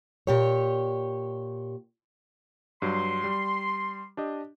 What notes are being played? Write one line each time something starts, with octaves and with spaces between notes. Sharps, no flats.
A#2 G4 C#5
G2 F#3 C6
G3
D4 G4 D#5